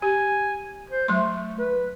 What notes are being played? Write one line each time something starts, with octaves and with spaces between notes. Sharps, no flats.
G4 G#5
C5
F#3 A3 C6
B4